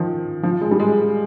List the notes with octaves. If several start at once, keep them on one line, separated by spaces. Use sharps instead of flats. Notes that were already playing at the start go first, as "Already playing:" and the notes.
Already playing: D#3 F3
F3
G#3
G3
G#3